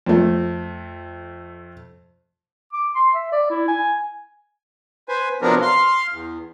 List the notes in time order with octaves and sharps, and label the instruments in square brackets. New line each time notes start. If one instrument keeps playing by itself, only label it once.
[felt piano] F2 A3
[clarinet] D6
C6
E5
D5
E4
G#5
[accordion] B4 C5 G#5
C3 F3 F#3 B3 D4 A#4
F5 C6
E2